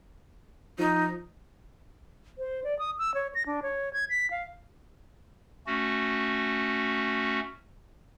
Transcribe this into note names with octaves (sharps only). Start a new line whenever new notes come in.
F3 D#4
C5
D5
D#6
E6
C#5
A#6
D4
C#5
G#6
B6
F5
A3 C#4 F#4